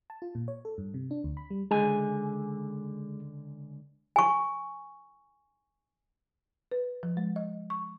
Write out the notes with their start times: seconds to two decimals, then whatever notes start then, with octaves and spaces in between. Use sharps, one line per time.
0.10 A5
0.22 F4
0.35 A#2
0.48 C#5
0.65 A4
0.78 G2
0.94 C3
1.11 D4
1.24 D2
1.37 B5
1.50 G3
1.71 C#2 D3 G#3 G#5
4.16 G#5 C#6
6.72 B4
7.03 F3
7.17 G#3
7.36 D#5
7.70 C#6